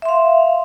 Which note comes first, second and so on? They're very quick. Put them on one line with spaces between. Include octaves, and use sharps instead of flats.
E5 C6 F5